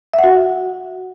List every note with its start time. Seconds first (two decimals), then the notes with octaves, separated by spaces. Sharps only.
0.13 E5
0.19 F#5
0.24 F#4